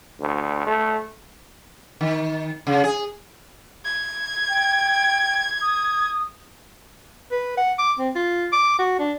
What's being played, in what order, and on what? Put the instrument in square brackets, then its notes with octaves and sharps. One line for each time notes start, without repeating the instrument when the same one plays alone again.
[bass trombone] D2
A3
[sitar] D#3
C#3
G#4
[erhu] G#6
[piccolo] G5
D#6
[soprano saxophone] B4
F#5
D6
C4
F4
D6
F#4
D4